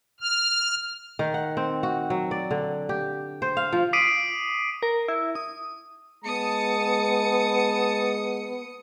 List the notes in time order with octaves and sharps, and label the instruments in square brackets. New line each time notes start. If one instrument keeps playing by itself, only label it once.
[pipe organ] F6
[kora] D#3
F#5
C4
F#4
F#3
D5
D3
G4
C5
F5
F3
[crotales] D6 D#6 B6 C7 D7 D#7
[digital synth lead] A#4
E4
D#6
[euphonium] G#3 [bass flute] B3 [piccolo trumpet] A5 [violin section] D#6 C#7